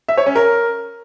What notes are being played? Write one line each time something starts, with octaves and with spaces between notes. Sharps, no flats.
E5
C#5
C#4
A#4